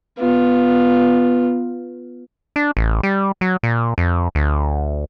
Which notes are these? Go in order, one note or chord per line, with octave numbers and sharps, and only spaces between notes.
B3 F4
D4
A1
G3
F#3
A#2
F2
D2